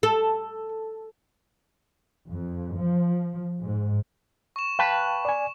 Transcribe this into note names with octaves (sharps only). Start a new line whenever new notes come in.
A4
F2
F3
G#2
C#6 E7
B4 F5 G5 A5
D5 G#5